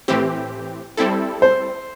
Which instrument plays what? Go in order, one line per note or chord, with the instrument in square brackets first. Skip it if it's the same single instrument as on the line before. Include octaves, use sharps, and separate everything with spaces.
[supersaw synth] A2 E3 C4 G4
G3 C4 E4 A4
[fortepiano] C5